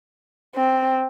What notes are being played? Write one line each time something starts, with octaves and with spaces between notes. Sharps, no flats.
C4